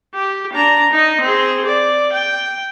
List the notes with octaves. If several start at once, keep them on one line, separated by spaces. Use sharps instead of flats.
G4
D4 A#5
D#4 D#5
C4 G#4
D5
G5